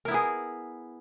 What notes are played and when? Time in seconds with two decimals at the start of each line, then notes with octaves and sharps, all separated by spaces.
0.05 A#4
0.08 E4
0.11 B3
0.14 G#4